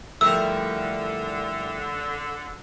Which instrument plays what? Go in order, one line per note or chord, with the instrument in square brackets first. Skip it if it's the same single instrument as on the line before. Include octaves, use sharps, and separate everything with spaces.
[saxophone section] D3 [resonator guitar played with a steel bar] F3 A3 [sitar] G3 E4 A#4 [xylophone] E6